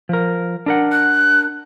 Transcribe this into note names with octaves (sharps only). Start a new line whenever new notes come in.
F3 A#4
D4 A#4 F#5
F#6